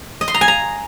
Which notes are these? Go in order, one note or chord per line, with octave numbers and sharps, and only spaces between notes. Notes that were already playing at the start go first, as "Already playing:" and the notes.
D#5
C6
A#5
G#5
A#5